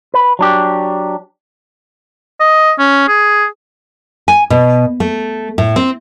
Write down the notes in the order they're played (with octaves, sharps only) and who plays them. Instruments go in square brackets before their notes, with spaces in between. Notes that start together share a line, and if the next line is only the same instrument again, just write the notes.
[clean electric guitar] B4
F#3 D4 G4
[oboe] D#5
C#4
G#4
[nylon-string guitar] G#5
B2
A3
A2
C4